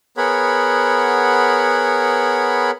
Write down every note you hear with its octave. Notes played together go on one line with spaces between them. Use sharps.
B3 G#4 A#4 C#5 F#5 B5